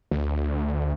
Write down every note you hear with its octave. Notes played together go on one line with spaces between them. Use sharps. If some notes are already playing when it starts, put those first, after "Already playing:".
D2